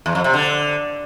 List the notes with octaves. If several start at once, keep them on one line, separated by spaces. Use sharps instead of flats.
E2
F2
C3
D3